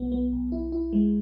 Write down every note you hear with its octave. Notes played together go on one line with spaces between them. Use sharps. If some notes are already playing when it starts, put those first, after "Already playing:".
Already playing: B1 B3
B3
B1
E4
E4
G#3